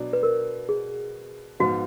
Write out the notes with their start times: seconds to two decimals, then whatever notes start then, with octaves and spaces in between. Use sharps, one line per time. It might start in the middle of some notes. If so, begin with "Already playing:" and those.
Already playing: B2 F#3 D4
0.13 B4
0.23 A#4
0.69 G#4
1.60 G#2 F3 B3 F4 F#4